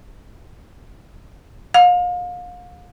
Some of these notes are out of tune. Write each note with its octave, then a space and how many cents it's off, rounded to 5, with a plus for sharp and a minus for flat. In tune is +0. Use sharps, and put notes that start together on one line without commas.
F5 +35